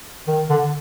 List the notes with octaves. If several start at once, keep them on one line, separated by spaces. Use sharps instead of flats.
D#3
D3